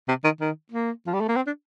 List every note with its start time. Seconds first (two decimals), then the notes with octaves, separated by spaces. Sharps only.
0.08 C3
0.24 D#3
0.41 D#3
0.72 A#3
1.06 F3
1.14 G3
1.21 A3
1.28 A#3
1.36 C4
1.47 D4